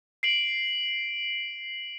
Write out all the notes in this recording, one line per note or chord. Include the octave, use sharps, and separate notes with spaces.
C7 D7 F#7